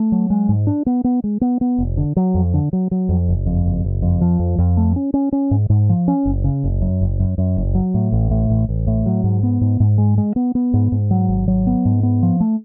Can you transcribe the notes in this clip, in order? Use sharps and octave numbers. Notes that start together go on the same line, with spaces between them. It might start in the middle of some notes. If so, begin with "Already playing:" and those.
Already playing: A3
F#3
G#3
G#2
D4
B3
B3
G#3
B3
B3
F1
D3
F#3
F2
D3
F#3
F#3
F2
F#1
F2
F#1
F#1
F2
F3
F2
F2
A3
C#4
C#4
C#4
G#2
G#2
F3
C#4
F#1
C#3
F#1
F#2
F#1
F#2
F#2
F#1
F#3
A2
A1
A2
A1
A1
A2
F#3
G#2
B3
G#2
G#2
G#3
G#3
B3
B3
G#2
G#2
F#3
G#1
F#3
B3
G#2
B3
F3
A3